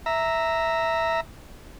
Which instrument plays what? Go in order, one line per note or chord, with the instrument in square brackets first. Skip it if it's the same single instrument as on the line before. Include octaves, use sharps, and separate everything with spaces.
[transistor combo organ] E5 A#5